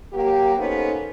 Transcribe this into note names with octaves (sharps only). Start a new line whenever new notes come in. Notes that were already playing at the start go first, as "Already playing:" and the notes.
F#3 A#3 G4
A#3 B3 C#4 D#4 A4 C5